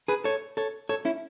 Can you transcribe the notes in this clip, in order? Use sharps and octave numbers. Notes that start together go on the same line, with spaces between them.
G#4 B4
A4 C#5
A4 C#5
A4 C#5
C#4 E4